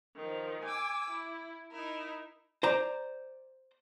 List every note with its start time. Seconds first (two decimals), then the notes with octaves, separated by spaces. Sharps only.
0.16 D#3 F3
0.63 G#5 D6 E6
1.10 E4
1.72 D#4 E4 A#4
2.63 C5 D5 A#5